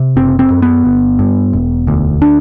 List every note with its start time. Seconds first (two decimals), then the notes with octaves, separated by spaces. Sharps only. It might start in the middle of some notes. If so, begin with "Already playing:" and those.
Already playing: C3
0.16 F#1 C4
0.39 C4
0.50 F#2
0.62 B3
0.85 G1
1.19 G2
1.53 E1
1.87 D2
2.22 D4